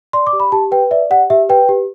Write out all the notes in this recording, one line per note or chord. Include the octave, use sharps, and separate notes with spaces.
D5 C6
D6
G4
B5
G4 A5
B4 G5
D5 E5
G4 F#5
G4 E5
B4 G5
G4